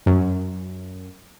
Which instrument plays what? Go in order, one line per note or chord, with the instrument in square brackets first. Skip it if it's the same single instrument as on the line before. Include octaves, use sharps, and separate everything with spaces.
[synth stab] F#2